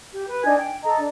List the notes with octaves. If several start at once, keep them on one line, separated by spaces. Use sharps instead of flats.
G4
B4
D4 D#4 G#5 G#6
G5
A4 D#5 A#5
D4